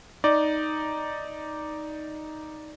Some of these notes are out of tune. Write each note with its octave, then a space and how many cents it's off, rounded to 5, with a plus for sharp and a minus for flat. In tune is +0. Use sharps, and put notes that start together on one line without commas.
D#4 +0 D5 +0